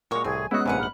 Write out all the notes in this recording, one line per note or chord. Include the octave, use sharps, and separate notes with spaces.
A#2 G#3 F#4 A#4 C#5
C2 A2 C4 G#4 G#5 C#6
G#3 B3 C#4 E4 F#4 D#6 E6 F#6
A#1 G#2 C3 E4 B4 F5 F#5 G#5
B5 F6 F#7